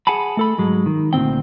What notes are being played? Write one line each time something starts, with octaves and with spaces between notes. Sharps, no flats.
G#4 F#5 G#5 A5 B5
A3 A4 B5
G#2 F#3 G#3
D#3
D2 A#2 C#3 C4 G5